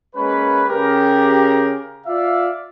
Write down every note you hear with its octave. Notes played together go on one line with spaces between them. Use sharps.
G#3 A#3 C#4 B4
C#3 G4 A#4
F4 D5 E5 F5